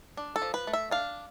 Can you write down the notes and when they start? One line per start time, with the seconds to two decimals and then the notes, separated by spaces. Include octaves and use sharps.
0.17 D4
0.36 A4
0.42 F3
0.54 B4
0.67 A3
0.73 E5
0.91 D4 F5